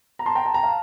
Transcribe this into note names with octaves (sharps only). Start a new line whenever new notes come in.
A#5
A5 C6
G5 A#5
A5
A#5
F5 A5